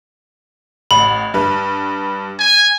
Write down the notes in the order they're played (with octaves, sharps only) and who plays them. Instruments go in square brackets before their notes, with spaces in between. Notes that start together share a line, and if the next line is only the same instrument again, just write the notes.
[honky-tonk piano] A1 [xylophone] B5
[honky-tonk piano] G2 B4
[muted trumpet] G#5